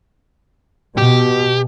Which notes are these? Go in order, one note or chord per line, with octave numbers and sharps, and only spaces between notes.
B2 G4